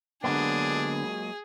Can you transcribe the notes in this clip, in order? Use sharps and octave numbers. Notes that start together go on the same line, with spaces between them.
D3 F#3 G#3 A#3 B3 D4 G#4